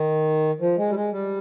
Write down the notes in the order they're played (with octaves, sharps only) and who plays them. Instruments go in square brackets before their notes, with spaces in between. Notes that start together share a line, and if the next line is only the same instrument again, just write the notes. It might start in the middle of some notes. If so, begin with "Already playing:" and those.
Already playing: [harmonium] D#3
F3
G#3
G3
G#3
G3